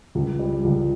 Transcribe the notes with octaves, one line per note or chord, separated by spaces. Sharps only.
C#2
G3
C#2